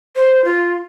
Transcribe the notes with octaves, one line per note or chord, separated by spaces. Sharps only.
C5
F4